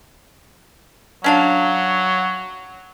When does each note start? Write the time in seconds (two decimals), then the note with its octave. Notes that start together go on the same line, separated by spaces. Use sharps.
1.24 F#3 C#4 D4 F5